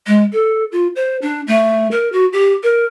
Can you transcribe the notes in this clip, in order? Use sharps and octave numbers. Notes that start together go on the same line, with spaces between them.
G#3
A4
F4
C5
D4
A3
A#4
F#4
G4
A#4